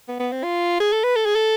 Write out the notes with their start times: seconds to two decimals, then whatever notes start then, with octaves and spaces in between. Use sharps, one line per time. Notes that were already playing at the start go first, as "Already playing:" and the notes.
0.08 B3
0.20 B3
0.32 C4
0.43 F4
0.80 G#4
0.93 A4
1.04 B4
1.16 A4
1.26 G#4
1.35 A4